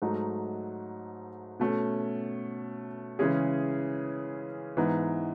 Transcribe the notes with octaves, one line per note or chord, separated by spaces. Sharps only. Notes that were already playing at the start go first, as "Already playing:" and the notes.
G#2 F#3 A3 D#4
B2 A3 C#4
C#3 E3 G#3 C#4 G#4
G#2 E3 B3 D#4